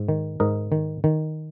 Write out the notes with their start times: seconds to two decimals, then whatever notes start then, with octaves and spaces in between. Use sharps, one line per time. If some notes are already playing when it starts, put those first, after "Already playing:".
Already playing: G#2
0.09 D#3
0.40 G#2 A#4 D#5
0.72 D#3
1.04 D#3